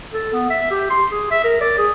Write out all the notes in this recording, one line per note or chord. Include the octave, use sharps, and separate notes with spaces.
A4
B3
E5
G4
C6
G#4
E5
A#4
D5
G#4